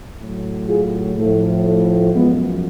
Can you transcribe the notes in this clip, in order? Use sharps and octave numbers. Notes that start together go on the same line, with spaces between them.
A2 F#3
F4 G#4
A2 F3 A3
A3
F#2 F3 G#3 B3